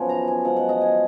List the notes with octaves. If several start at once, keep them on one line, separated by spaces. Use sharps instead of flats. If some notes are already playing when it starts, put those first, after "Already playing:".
Already playing: F#2 F3 B3 G#5
A#5
G#5
F#2 F3 G#3 F#5
F#5
D#5
G#5